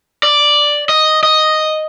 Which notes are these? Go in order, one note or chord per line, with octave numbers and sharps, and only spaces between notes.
D5
D#5
D#5